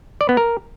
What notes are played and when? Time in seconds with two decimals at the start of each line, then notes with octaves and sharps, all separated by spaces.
0.21 D5
0.29 B3
0.37 A#4